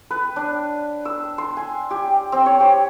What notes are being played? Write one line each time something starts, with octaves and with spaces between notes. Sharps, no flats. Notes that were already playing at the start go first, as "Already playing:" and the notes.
B4
D4
E6
C6
G#5
G4
C4
C#5
G4